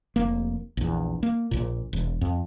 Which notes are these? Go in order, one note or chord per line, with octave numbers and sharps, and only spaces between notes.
F1 A#3
A#1 E2
A#3
A#1 A#2
E1
F2